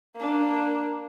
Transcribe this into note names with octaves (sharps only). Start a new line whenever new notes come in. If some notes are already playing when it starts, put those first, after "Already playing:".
A#3 D4